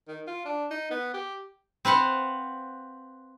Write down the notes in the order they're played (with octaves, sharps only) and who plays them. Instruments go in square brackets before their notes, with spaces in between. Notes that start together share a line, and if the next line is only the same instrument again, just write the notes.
[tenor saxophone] D#3
F4
D4
D#4
B3
G4
[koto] C4 B4 F5 F#5